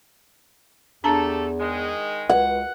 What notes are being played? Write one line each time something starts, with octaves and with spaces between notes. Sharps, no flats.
E2 A3 D4 G4 A4 A5 A#5
D#3 G#3
C#2 B4 F#5